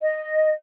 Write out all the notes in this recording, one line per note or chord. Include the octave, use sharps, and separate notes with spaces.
D#5